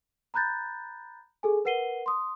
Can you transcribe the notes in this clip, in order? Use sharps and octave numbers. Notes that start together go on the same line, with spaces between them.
A#5 B5 F#6 G6 A6
G#4 A4 G#5
A#4 B4 F#5 C7 D#7 G7
C6 D#6